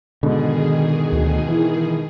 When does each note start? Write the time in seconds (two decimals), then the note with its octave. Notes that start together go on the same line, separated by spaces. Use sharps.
0.23 G#2 B2 D3 D#3 G#4
1.13 D2
1.48 E3